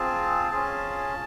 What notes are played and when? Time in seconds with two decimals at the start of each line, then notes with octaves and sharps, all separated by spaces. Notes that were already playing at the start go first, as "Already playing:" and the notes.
Already playing: C4 F4 G#4 A5
0.52 C#4 F4 G#4